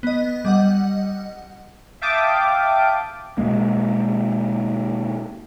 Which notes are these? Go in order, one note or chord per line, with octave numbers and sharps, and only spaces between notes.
B3 D#5
G3 D#5 F#5
E5 F5 G5 A5 D6 D#6
B2 G#3 A#3